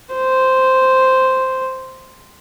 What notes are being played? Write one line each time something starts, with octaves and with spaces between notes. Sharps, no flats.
C5